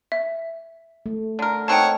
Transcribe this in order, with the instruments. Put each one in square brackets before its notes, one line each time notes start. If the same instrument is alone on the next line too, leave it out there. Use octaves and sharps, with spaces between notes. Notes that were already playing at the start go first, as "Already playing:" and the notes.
[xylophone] E5
[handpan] A3
[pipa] D3 A#4
[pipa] A#3 C4 D#4 [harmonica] C#5 F#5 [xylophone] G5 A5